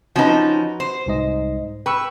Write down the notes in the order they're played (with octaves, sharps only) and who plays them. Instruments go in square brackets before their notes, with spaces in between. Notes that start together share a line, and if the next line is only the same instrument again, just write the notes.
[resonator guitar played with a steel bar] F3 C#4 D#4 [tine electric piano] F#4 B4
[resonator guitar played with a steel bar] C5
[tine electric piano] C2 G#2 D#5
[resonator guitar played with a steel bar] B4 [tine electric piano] G5 C#6 E6